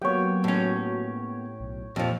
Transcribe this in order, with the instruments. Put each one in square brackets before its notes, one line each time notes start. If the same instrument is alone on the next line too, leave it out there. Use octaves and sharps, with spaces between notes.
[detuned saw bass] F#3 [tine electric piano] A#3 B3 G4 [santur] C#5 G5
[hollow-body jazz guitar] A2 C#4
[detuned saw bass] B1
[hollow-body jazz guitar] F2 F3 [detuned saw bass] A#2